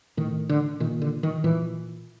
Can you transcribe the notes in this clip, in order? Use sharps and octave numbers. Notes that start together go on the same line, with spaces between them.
A2 D#3
D3
A#2 D#3
D3
D#3
A#2 E3